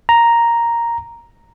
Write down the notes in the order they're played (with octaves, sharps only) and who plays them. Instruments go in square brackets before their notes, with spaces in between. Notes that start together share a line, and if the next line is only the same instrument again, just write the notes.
[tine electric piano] A#5